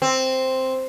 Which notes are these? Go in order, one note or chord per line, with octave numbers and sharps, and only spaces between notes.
C4